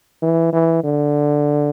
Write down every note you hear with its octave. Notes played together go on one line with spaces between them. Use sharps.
E3
E3
D3